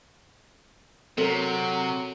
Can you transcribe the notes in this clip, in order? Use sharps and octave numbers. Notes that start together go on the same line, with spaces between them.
C3 F#3 C4 A4 A#4 F#7